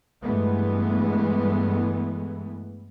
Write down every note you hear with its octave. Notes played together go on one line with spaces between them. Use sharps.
G2 E3 G#3 A3 B3